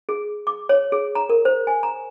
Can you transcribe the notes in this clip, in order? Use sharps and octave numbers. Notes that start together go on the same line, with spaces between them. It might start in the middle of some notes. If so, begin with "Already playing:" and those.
G#4
D6
C#5
G#4
A#5
A#4
C5
G#5
A#5